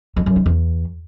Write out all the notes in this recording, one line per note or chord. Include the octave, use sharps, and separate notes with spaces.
F2
F#2
D#3
E2